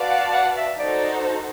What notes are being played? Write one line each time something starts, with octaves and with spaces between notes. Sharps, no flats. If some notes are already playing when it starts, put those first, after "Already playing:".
Already playing: F#4 B4 D5 F5 A5
F#5
F#5
E5
D#4 F#4 A4 C5 D5